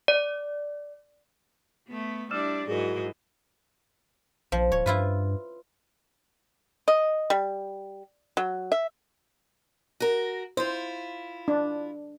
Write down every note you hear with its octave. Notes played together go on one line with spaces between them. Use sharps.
D5
A3 B3
G3 D4 E4 D5 E6 F6 E7
G#2 F#3 E4 F#4 G#4 A#4 D#5
A#1 F3
D1 C#5
G2 E4 F4 B4
D#5
G3
F#3
E5
F#4 A#4
E4 F4 C5
D4